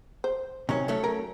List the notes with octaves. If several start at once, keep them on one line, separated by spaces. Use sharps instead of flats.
C5
C3 D#3 F#3 C#4
F#3 A3 C#4
A#4